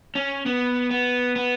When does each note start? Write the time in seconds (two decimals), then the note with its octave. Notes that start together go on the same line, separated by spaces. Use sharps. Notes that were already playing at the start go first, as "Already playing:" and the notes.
0.15 C#4
0.46 B3
0.91 B3
1.36 B3